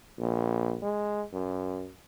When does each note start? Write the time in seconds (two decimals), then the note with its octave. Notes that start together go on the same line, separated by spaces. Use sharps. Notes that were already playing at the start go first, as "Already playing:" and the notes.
0.18 A#1
0.82 G#3
1.33 F#2